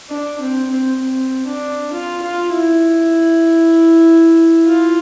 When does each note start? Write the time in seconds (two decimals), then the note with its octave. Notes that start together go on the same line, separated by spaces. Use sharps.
0.10 D4
0.41 C4
0.70 C4
1.02 C4
1.47 D4
1.92 F4
2.22 F4
2.53 E4
4.66 F4